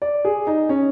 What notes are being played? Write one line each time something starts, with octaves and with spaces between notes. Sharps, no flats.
D5
G#4
D#4
C#4